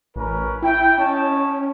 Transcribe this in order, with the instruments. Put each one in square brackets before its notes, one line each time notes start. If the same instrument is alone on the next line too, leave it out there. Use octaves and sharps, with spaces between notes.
[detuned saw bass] A1 [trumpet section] C#4 A#4 B4
[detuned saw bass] E4 [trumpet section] G5
[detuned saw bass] C#4 [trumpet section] C#5 D#5 A5